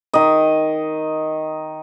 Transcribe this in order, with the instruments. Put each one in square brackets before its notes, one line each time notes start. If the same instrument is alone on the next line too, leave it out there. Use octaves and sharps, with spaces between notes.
[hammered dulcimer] D#3 D#5